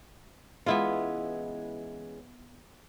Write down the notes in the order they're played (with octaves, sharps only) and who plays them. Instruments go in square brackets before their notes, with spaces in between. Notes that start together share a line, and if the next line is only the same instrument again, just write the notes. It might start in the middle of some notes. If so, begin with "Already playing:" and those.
[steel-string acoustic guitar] E3 G#3 C#4 [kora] B3 E4 F4